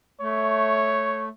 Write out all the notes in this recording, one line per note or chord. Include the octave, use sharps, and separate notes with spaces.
A3 C#5